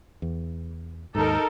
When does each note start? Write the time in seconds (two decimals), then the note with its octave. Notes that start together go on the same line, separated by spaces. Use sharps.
0.22 E2
1.15 D#2 G#2 D#4 A4 A#4